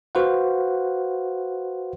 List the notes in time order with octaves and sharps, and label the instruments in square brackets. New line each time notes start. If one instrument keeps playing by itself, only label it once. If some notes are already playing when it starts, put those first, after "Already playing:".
[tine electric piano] F#4 B4 C5 F5 F#5